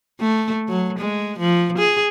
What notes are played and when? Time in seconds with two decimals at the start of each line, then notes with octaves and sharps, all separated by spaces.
0.21 A3
0.69 F#3
0.99 G#3
1.39 F3
1.78 G#4